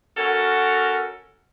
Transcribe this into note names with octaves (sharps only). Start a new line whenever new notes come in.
C#4 F#4 A4 A#4